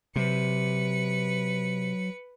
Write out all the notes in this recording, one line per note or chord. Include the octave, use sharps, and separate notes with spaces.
C3 F#3 B4 C#7